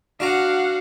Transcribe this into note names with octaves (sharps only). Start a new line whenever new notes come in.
D4 F#4 F5 F#5 A#5